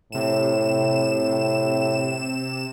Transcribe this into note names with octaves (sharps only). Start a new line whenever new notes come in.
A2 C3 E7